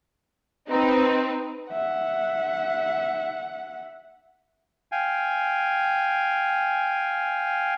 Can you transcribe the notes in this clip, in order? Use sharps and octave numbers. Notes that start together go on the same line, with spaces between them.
C4 D#4 B4
E5 F#5
F5 G5 G#5